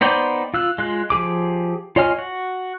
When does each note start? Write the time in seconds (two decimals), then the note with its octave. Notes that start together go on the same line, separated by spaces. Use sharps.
0.01 B3 D#4 C5 D5 G5
0.54 F4 E6 F#6
0.78 G#3 F4 F#6
1.10 F3 G4 G#4 D6
1.96 F4 C#5 D#5 G#5 F6
2.19 F#4